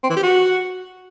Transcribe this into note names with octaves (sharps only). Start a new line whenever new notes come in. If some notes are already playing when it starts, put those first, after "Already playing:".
C4
E3
G4
F#4